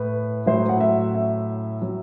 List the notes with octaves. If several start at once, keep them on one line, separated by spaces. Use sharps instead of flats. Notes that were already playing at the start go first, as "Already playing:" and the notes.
Already playing: A2 B4
A2 F#3 C5
F#5
E5
E5
F#3